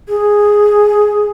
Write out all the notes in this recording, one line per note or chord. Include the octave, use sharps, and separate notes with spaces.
G#4